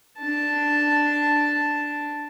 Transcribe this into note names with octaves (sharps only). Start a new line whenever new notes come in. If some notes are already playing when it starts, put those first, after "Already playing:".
D4 A5